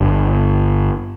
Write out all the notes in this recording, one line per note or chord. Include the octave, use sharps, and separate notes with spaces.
G1